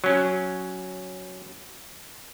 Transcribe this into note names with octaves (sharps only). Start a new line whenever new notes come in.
F#3 C#4